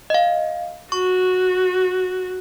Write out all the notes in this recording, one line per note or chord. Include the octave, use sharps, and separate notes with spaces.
D#5 F5
F#4 C#6